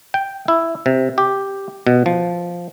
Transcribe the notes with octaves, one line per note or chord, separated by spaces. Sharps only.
G5
E4
C3
G4
B2
F3